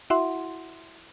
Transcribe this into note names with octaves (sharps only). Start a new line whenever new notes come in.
E4 F#4 E5 F#5 C6